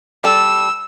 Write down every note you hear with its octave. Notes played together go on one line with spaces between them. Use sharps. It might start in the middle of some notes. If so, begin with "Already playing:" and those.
G3 A4 E6